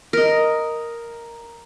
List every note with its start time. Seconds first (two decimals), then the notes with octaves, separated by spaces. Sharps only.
0.13 A#4 D#5